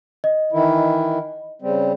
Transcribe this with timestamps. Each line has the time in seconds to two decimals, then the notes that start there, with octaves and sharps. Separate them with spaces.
0.24 D#5
0.52 D#3 E3 E4
1.62 C#3 G3 C4